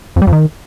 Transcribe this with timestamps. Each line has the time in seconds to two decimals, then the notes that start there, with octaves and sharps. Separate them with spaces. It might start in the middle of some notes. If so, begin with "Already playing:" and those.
0.16 F2
0.22 G3
0.27 F2
0.33 D#3